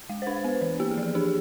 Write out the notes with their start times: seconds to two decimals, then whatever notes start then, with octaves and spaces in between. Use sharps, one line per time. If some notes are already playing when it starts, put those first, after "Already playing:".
0.09 G#3
0.22 C5
0.26 D4 B4
0.44 B3
0.61 E3
0.80 A#3 G4
0.91 G#4
0.97 F3
1.03 G#4
1.15 D4 G4